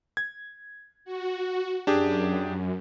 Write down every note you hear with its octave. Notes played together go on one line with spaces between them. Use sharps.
G#6
F#4
F#2 D4 G4 G#4